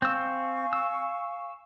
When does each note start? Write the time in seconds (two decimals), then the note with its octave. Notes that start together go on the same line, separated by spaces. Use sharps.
0.02 C4 F5 G#5 C#6 E6
0.73 E6